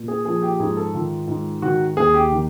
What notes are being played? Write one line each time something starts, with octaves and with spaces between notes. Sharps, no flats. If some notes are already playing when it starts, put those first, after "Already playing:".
Already playing: A#2
G#4
F3 G#4
G4
G#2 G#4
A4
D#3 F4
G#2
D#3 F#4
D#2 G#4
G4
D#3